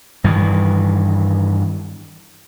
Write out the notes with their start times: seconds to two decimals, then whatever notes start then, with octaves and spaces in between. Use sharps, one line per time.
0.24 G2 D#3 E3